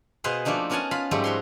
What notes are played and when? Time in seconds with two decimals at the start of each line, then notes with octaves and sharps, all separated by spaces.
0.24 B2 G#4 B4 C5 F5
0.45 F3 A3 A#3 D4 D#4
0.70 B3 C#4 A#4 F#5 G#5 A5
0.91 F4 F5 B5
1.11 G#2 F3 G3 A3 G4
1.24 F#4 C#5 C6